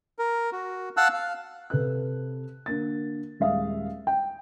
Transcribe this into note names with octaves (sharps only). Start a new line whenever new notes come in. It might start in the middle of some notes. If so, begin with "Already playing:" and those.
A#4
F#4
F5 F#5 A5 E6 F#6
F5
C3 A4 B4 F#6
D3 A#3 A6
D#1 G#3 E5 F5 D#6
G5